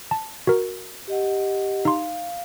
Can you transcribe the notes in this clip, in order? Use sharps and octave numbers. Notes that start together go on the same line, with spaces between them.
A5
F#4 A#4
G4 D#5 F#5
D#4 F5 C6